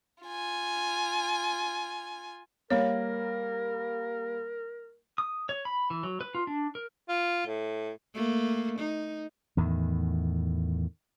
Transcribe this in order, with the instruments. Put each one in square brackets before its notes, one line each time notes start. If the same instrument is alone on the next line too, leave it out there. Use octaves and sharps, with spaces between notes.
[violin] F4 G#5
[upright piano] G3 A#3 [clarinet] A#4 [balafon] C#5
[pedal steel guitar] D#6
C#5
B5
E3
F#3
B4
F4
D4
A#4
[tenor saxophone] F4
A2
[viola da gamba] A3 A#3
D#4
[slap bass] E2 A2 D#3